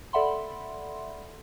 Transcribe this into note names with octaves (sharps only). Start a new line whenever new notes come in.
A4 D5 E5 F#5 B5 C6